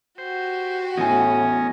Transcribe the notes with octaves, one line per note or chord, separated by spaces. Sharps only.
F#4 G4 C5
E2 A2 C#4 D#5 G#5